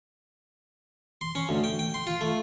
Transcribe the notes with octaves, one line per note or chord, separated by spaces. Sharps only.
C6
C#4
D2
G5
G5
C6
F4
A3